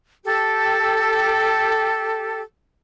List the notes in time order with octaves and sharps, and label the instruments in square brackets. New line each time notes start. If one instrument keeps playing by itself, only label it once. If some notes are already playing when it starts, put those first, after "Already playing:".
[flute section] G4 A4